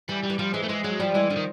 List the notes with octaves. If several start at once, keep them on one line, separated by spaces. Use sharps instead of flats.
E3 G3
G3
E3
F3 G3
E3 G#3
A3
E3 G#3
F#3 G#3
F3 G3
E3 G#3
D3 F3
D#3